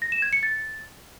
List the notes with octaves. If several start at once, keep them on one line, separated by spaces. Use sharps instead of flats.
A#6
E7
G#6
C#7
A6